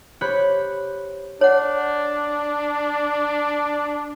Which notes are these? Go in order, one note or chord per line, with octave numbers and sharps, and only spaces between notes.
G4 C5 C#5 B5 F#6 G6
D4 C#5 F#5